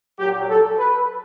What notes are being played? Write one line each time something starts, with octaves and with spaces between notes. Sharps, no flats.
A#2 F#3 G4
A4
B4